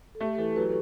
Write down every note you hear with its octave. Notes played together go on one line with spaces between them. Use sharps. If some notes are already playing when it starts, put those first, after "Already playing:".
A4
A3 G4
E3 A4
F#3 B4